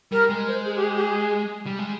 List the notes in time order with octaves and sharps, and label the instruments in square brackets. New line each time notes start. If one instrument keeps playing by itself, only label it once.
[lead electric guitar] G3 [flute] A#4
[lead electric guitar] G#3
[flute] C5
G#4
G4
G#4
G4
G#4
[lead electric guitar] G3
G#3